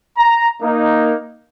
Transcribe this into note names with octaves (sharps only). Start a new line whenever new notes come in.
A#5
A#3 D#4